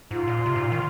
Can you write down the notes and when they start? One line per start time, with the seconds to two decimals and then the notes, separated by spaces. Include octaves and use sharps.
0.10 G#2 F4
0.28 A#2
0.46 C3
0.56 G#2
0.63 A#2
0.72 D#3